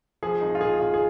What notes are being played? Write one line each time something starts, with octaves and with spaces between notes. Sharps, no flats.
F3 G#4
G#1 D#4
F4
G#1 G#4
G#1 F4
G#4